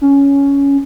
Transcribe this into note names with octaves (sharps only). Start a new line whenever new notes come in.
C#4